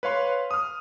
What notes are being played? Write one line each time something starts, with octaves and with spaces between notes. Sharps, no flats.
B4 C#5 F5 C6
D#6 F6